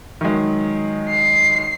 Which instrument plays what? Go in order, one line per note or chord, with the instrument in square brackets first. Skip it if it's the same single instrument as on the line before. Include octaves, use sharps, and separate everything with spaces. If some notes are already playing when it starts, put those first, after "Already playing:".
[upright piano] D#3 F#3 G#3
[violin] C7